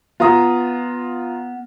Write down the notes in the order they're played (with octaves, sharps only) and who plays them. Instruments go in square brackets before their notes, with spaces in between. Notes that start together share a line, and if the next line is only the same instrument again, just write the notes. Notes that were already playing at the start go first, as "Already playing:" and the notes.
[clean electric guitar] B3 [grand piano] F4 A#5 D#6